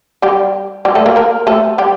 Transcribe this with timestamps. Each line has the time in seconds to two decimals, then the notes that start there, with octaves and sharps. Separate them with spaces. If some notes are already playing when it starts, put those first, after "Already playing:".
0.22 G3 G4
0.85 G3 G4
0.95 A3 A4
1.06 A#3 A#4
1.16 A#3 A#4
1.47 A3 A4
1.78 G3 G4